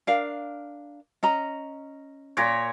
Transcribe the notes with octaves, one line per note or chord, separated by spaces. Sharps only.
D4 A#4 F5
C#4 D#5 A#5
A#2 C#5